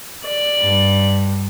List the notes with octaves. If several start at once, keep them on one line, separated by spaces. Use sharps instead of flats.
D5
G2